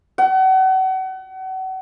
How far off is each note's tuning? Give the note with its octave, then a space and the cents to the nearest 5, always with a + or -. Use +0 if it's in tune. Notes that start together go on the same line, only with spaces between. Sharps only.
F#5 +35